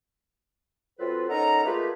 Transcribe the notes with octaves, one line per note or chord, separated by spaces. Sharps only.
F#3 C4 F4 A4 B4
C#4 D#4 A4 A#4 F#5 A#5
A3 A#3 F4 G4 G#4 B4